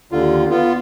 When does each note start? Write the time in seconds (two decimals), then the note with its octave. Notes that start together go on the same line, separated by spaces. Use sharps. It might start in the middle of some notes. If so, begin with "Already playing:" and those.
0.11 D#2 D3 F4
0.50 B3 F4